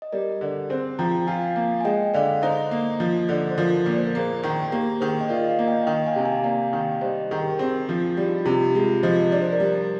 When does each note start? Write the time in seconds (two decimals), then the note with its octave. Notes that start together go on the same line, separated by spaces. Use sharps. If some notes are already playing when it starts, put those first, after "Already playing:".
0.02 D#5
0.12 G3 A#4 D5
0.41 D3
0.70 C4 G#4 C5
0.99 F3 G5 A#5
1.27 F4 F5 G#5
1.56 A#3
1.81 G#5
1.85 G#3 D#5 G5
2.14 D3 D5 F5
2.42 D#4 C5 D#5
2.71 A#3
3.00 F3
3.29 D3
3.50 C5
3.57 F3 A#4 D5
3.85 A#2 D5
3.97 C5
4.07 A#4
4.15 A#3 G#4 C5
4.43 D#3
4.72 A#3 G4 A#4
5.00 D#3 G#4 C5
5.21 D#5
5.29 F4 A#4 D5
5.44 D#5
5.49 D5 F5
5.59 A#3
5.67 D#5 G5
5.87 D#3 D#5 G5
6.06 F5 G#5
6.16 C3
6.25 F5 G#5
6.44 A#3 D5 F5
6.73 D#3
7.01 G3 C5 D#5
7.31 D#3 G#4
7.40 G4 A#4
7.59 C4 G#4
7.89 F3
8.17 G3 F4
8.28 D#4
8.38 F4
8.45 C3
8.75 G#3 F4
9.03 F3 C5 D#5
9.32 D4 D5
9.42 C5
9.52 A#4 D5
9.60 G3